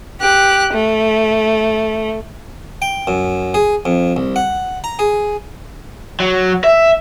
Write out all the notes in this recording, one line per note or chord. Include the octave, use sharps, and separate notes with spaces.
G4 F#6
A3
G5
F#2
G#4
F2
C2
F#5
A#5
G#4
F#3
E5